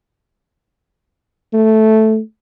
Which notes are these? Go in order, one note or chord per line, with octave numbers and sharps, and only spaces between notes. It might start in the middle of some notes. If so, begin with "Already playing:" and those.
A3